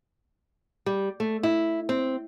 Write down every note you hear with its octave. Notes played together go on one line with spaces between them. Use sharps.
G3
A3
E4
C4